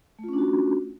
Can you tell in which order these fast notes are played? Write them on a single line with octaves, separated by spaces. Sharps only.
A3 F4 C#4 D4 F#4